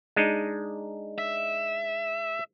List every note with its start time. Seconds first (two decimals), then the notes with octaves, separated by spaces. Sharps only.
0.16 G#3 D4 D#4
1.18 E5